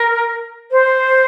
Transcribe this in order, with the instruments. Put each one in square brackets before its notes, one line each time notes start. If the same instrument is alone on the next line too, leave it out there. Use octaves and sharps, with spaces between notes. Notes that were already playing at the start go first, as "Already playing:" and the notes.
Already playing: [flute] A#4
C5